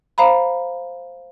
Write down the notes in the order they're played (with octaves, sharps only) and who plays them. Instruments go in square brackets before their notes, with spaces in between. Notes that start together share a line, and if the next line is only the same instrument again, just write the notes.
[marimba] C5 F5 A#5 B5